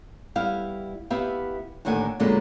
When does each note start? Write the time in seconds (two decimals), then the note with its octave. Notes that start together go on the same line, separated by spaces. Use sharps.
0.36 G3 B3 E4 F5
1.10 B3 E4 G4 E5 F5
1.85 D#2 A2 D3 D#3 F#5 G#5
2.20 F#2 A#2 D3 G#3 A#3 B3